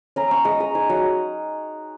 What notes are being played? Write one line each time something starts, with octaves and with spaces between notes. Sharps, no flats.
C#4 A#5
C#4 C#6
G#3 D#6
G#3 A#5
D#4 G#5
F#3 F#5